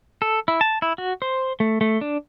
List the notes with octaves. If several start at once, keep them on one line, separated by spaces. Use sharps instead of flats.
A4
E4
A5
E4
F#4
C5
A3
A3
D4